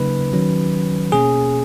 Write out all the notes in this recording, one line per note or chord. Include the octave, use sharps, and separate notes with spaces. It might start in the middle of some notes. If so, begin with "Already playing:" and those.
Already playing: C#3 F#3 A#3 D#4 B4
D#3 F#3 C#4
B2 A#3 C#4 G#4